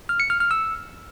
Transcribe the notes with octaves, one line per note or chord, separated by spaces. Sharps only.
F6
C#7
F6
F6
E6